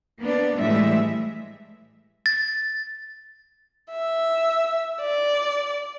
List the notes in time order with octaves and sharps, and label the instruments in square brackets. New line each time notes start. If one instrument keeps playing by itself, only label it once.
[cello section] A#3 B3 D4
A2 E3 G3 G#3 E5
[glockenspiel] A6
[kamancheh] E5
D5